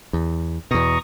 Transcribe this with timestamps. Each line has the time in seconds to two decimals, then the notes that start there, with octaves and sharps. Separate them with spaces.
0.13 E2
0.71 E2 B2 A#5 C#6 D#6